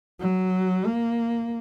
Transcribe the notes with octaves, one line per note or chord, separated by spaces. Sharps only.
F#3
A#3